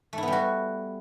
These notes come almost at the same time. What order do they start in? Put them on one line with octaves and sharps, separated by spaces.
A3 E4 B3 G3 F#4